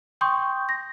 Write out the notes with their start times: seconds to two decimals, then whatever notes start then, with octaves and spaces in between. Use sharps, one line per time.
0.21 G5 C6 C#6 D#6 G6
0.69 A#6